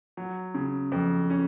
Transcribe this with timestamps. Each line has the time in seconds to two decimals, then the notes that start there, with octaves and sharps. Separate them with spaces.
0.17 F#3
0.55 C#3
0.92 F2
1.30 C#4